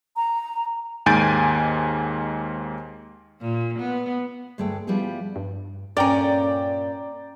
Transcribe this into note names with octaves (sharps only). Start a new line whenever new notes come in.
A#5
D#2 G#2 G#5 G6 A6 D7
A#2
B3
D2 G2 G#3 A3 A4 G5
F3 G3 B3 E4 G4 G#4
G2
G2 A#2 C#4 A#4 D5 G5 A#5